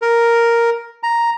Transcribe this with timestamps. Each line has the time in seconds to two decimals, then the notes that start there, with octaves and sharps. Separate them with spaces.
0.02 A#4
1.03 A#5